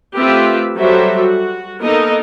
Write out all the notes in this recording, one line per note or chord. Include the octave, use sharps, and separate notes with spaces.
A3 C4 F4 G4 B4 E5
F#3 G3 F#4 A4 C5 E5
F#4
A#3 B3 D#4 A4 A#4 D#5